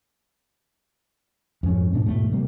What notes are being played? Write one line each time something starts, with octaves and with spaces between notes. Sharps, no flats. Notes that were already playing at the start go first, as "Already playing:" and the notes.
F2 G#2 C#4
G#2 B2 D4
E2 G#2 B2 A3
C3 G3 A#3